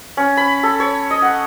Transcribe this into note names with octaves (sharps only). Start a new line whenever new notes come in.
C#4
B5
A4
C#5
D#5
F#5